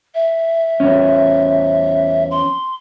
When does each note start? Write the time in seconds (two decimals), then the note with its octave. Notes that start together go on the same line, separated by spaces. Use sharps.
0.15 E5
0.80 E2 C#4
2.31 C6